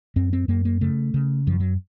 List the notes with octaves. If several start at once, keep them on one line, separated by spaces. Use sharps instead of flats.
F#2 C4
C4
F#2 A#3
A#3
C#3 A3
C#3
F#2 F3
F#3